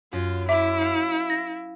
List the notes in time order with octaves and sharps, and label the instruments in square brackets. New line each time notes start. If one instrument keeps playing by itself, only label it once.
[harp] F#2 [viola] F4
[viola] E4 [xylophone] E5 [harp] D6
[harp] F5
[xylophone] A#6